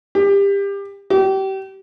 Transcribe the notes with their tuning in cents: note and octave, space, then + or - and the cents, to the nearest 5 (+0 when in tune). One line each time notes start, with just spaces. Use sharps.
G4 +25
G4 -30